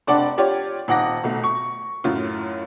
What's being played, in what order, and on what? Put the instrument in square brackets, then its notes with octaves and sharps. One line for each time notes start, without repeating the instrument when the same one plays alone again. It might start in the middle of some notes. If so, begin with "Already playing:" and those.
[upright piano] F1 D4 D5 F#5 A5
F4 G4 C#5 D5
D#1 D#4 F#5 D6 A#6
B1 A3
C#6
F#2 A2 F#3 F4